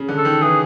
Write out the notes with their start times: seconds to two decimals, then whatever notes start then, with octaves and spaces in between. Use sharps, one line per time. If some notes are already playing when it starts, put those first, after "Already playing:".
Already playing: C#3
0.09 D3
0.17 A4
0.25 D#3
0.41 E3 G#4